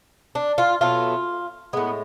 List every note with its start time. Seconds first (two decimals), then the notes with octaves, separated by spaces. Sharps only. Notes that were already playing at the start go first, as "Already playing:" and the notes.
0.35 D4
0.58 F4
0.81 B2 F#3 A3 F4
1.73 A2 G#3 B3